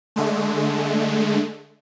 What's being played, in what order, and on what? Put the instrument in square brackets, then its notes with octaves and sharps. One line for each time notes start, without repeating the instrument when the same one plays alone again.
[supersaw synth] D3 G#3 A3